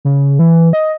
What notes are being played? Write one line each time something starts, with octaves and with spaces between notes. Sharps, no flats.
C#3
E3
D#5